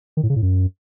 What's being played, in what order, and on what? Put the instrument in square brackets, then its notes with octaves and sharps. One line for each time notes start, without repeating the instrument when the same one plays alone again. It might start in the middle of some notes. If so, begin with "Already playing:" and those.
[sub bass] D#3
A2
C#3
A2
F#2